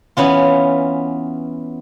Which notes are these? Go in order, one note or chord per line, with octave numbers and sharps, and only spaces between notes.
E3 B3 C#4 F4